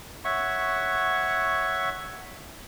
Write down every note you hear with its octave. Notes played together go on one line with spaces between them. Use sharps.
C#5 E5 F#5 C#6